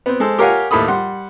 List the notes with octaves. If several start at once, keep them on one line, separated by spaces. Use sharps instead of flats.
B3 C4
G#3 A4 C5
G4 A#4 C#5 F5 F#5 G#5
D#2 A2 A4 B5 D#6
G3 F#5 C6